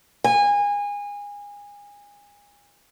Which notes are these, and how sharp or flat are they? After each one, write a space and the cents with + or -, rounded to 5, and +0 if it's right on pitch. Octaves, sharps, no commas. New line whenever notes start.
G#5 -25